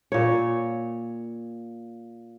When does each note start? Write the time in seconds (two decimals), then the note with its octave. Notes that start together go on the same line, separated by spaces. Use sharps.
0.12 A#2 C#5